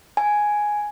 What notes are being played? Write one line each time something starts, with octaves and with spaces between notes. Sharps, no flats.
G#5